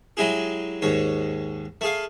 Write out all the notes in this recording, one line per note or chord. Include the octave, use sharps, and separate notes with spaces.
F#3 G#3 E4 G4 G#4
D#2 G#2 C#5
A3 G#4 F5